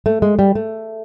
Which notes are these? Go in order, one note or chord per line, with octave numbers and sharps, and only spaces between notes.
A3
G#3
G3
A3